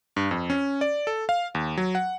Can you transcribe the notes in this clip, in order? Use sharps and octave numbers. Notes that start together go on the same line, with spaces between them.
G2
F2
C#4
D5
A4
F5
D#2
F#3
F#5